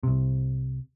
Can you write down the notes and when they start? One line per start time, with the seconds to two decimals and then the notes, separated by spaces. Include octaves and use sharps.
0.03 C2 C3